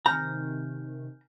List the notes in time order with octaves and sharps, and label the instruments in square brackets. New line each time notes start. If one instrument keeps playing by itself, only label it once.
[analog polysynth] C3 D#3 [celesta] G#5 F6 G6 [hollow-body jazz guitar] A#5